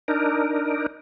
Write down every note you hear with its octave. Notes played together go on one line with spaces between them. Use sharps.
D4 D#4 A#4